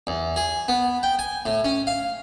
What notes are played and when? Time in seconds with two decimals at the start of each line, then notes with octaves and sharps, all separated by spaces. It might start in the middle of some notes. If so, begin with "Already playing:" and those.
0.07 E2
0.36 G#4
0.68 B3
1.03 G5
1.19 G#5
1.46 A2
1.65 C#4
1.87 F5